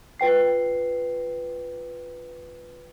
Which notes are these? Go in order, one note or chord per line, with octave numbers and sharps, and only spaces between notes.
F4 B4 G5 C7